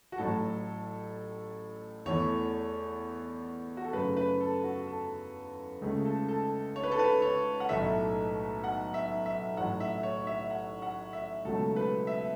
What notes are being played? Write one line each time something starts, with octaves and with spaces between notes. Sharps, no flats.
F#4
A1 A2 F#3 A3 A4
E2 E3 A3 C#5
F#4
A4
F#2 C#3 A3 B4
B4
A4
F#4
A4
C#2 C#3 A3
A4
A4
C#5
B4
A4
B4
C#5
F#5
B1 A2 A3 E5
F#5
E5
E5
A1 A2 F#3 F#5
E5
C#5
E5
F#5
F#5
E5
C#2 B2 F#3 A3 A4
B4
E5